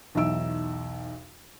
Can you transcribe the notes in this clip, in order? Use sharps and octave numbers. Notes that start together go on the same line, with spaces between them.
B1 E2 D#4 E5 E6 D7